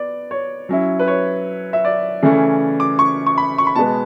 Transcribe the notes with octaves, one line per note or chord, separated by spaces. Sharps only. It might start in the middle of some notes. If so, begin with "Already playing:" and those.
Already playing: B3 D5
C#5
F#3 C#4 E4
B4
C#5
E5
D5
C#3 E3 A3 C#4
D6
C#6
C#6
B5
C#6
B5
B2 G#3 B3 A5